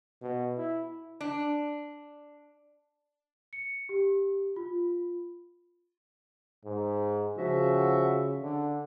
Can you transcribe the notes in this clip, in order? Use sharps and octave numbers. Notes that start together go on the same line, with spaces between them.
B2
E4
D4
C#7
G4
F4
G#2
C#3 F3 F#4 E5
D3